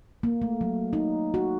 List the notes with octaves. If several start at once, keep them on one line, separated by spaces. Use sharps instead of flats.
A#3
A3
F#3
D#4
F#4